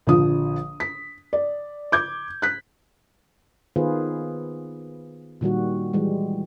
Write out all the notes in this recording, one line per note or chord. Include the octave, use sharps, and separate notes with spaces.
A#1 D3 F3 D#6
B6
D5
D6 G6 G#6
F#6 B6
D#3 B3 F4 G#4 B4 C5
A#2 D#3 G3 F#4
E3 G3 G#3